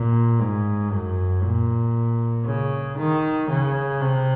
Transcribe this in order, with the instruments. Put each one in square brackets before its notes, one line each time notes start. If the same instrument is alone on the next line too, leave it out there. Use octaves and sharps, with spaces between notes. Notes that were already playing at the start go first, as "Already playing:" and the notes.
Already playing: [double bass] A#2
G#2
F#2
A#2
C#3
D#3
C#3
C3